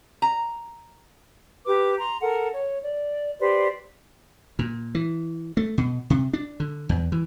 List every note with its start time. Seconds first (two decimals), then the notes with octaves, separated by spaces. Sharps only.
0.22 A#5
1.65 G4 B4 D6
1.99 A#5 C6
2.21 A4 A#4 F#5
2.53 C#5
2.81 D5
3.40 G4 B4 C5 D5
4.59 A#2
4.95 E3
5.57 A3
5.78 B2
6.10 C3
6.33 D4
6.60 D3
6.89 E2
7.12 E3